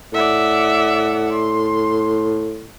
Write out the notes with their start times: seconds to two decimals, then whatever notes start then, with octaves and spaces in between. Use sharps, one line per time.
0.12 A2 D5 E5 F#5
1.32 C6